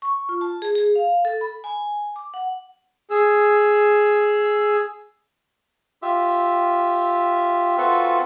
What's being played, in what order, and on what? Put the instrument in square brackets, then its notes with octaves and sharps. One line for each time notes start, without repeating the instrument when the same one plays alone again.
[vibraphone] C#6
F4
A5
G#4
G#4
F5
A4
B5
G#5
D6
F#5
[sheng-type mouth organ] G#4 E6
[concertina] F4 G4 E5
C4 F4 F#4 A4 B4 E5